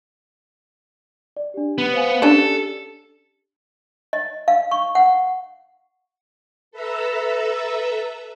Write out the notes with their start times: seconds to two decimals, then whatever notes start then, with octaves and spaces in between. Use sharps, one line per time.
1.37 D5
1.54 D4 G4
1.78 B3
1.93 C5 F5 G#5
2.22 C#4 D4 G4 A4
4.13 D#5
4.48 F5
4.71 C#6
4.95 F#5
6.71 A4 B4 E5 A#5 E6